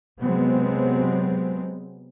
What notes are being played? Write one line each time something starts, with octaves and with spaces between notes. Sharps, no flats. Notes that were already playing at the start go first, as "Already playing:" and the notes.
C3 F#3 G#3 B3 C4